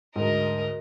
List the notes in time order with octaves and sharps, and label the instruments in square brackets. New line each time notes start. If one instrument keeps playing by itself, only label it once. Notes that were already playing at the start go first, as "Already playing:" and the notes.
[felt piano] D2 G#2 [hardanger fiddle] A#4 D#5